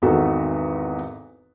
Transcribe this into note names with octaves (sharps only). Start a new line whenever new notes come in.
G#1 E2 D#4 F#4 A4